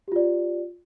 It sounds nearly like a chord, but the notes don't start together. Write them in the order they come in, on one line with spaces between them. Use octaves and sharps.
G4 F4 D5